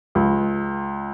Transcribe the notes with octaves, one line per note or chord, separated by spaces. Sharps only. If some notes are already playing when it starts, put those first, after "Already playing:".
C#2